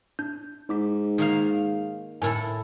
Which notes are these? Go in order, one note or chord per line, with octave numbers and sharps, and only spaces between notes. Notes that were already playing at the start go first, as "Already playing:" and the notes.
D4 G6
G#2 D#4 D6 B6
D#3 A#3 F5
A2 E4 A4 A#4 G#5